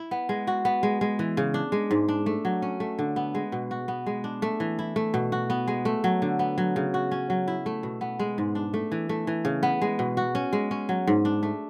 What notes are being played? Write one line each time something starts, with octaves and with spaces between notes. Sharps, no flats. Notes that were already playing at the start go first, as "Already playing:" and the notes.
Already playing: E4
B3
G#3
F#4
B3
G#3
G#3
E3
C#3
D4
G#3
G#2
D4
A3
F#3
C#4
A3
D3
B3
G#3
B2
F#4
B3
G#3
D4
A3
E3
E4
A3
B2
F#4
B3
G#3
A3
F#3
D3
B3
F#3
C#3
F#4
C#4
F#3
E4
A3
B2
B3
G#3
G#2
D4
A3
E3
A3
E3
C#3
B3
G#3
B2
F#4
C#4
G#3
C#4
F#3
G#2
D4
A3